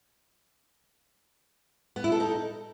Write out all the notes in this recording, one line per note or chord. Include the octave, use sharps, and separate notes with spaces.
B3
E4
A4
D#4